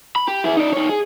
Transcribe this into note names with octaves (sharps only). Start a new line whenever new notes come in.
B5
G4
E4 G#4
D#4 D5
D#4 C#5
G#4